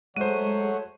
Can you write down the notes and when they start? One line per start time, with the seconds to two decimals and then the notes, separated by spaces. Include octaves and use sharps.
0.16 F#3 G#3 A3 C5 C#5 F#5 D#7